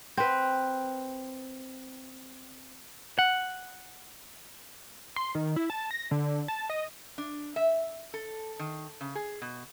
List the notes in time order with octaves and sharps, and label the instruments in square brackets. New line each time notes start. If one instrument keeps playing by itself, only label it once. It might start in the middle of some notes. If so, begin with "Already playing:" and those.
[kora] C4 B4
[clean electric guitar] F#5
[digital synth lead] C6
D#3
E4
A5
A#6
D3
A5
D#5
[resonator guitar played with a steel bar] D4
E5
A4
D#3
C#3
G#4
B2